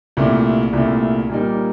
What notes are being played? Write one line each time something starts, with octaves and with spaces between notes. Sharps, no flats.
C2 A#2 A3
C2 A#2 A3
A#2 G3 A#3 D#4